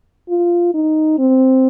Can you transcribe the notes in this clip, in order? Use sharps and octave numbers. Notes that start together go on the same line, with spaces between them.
F4
D#4
C4